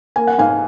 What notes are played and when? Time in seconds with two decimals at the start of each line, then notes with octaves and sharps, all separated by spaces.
0.16 A#3 G#5
0.27 F#5
0.38 G#2 F5 G#5